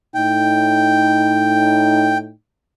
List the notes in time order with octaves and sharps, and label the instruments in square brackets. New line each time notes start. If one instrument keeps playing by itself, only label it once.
[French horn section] A2 D#4 [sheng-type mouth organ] G5